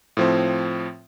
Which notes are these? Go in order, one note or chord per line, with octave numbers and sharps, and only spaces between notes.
A2 F3 C4